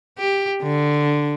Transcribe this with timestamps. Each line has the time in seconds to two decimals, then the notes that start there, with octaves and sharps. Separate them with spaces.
0.19 G4
0.62 D3